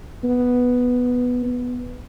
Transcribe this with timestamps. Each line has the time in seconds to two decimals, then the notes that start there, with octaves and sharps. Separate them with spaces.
0.24 B3
1.45 B3